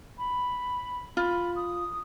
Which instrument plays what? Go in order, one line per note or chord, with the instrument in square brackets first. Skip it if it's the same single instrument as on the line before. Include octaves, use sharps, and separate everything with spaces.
[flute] B5
[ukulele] F4 [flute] B5
[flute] D#6